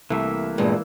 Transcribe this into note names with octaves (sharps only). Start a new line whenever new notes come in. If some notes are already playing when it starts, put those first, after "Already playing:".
C2 E3 A3 A#3 E5
E2 G2 A#2 G#3